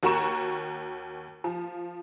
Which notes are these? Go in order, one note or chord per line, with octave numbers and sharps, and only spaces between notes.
D#2 F#4 A#4 A#5 C#6 E7
F3